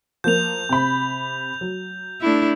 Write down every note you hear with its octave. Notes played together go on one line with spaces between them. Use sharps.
F3 A#3 G6 F7
C3 B5
F#3
A3 D4 E4